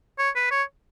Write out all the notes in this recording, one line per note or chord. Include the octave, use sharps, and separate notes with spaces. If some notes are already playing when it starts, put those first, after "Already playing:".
C#5
B4
C#5